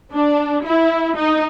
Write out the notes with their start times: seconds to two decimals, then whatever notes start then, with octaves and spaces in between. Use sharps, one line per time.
0.12 D4
0.65 E4
1.17 D#4